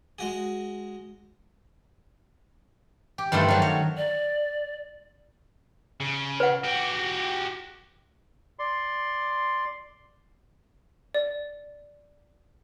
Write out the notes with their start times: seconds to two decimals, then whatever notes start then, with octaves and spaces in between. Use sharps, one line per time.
0.19 G#3 F#4 G#4
3.18 G4
3.32 G2 D#3 F3 A3 E4 C6
3.48 D#3 F#3
3.62 C#5
3.97 D5
6.00 C#3
6.40 B4 F#5
6.64 F#4 G4
8.59 D5 C6
11.14 D5